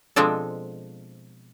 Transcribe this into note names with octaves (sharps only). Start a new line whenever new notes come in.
B2 F3 G#3 C4 D4 A4